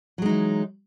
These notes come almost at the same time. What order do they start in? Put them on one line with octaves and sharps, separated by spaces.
F#3 G#3 D#4 E3